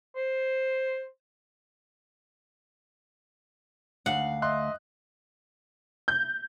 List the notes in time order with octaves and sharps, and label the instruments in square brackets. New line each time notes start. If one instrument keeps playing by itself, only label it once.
[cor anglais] C5
[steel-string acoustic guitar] D2 F5 [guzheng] F#5
[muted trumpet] D#5 [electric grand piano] E5 C6 F#6
[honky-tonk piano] G6